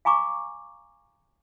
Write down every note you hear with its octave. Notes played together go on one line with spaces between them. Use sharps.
F5 G#5 A#5 C#6 D6